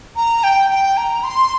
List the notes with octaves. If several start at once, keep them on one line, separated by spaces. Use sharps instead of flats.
A#5
G5
G5
A#5
C6